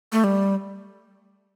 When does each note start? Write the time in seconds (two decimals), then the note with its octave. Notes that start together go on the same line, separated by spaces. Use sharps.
0.12 A3
0.24 G3